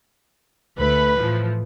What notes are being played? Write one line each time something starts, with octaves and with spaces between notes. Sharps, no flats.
D2 A3 B4 B5
A2 E3 F3